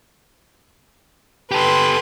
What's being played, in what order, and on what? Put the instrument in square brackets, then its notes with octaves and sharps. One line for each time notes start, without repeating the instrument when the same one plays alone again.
[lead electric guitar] G4 A4 [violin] B4 C6